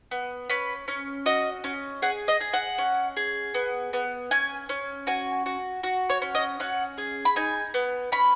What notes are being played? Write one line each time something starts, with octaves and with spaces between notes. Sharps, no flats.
B3
C#4 B4
C#4
F#4 D#5
C#4
G#4 F#5
D#5
G#4
F#5
C#4
G#4
B3
B3
C#4 G#5
C#4
F#4 G#5
F#4
F#4
C#5
C#4
D#5
C#4 F#5
G#4
B5
D#4 G#5
B3
C#4 B5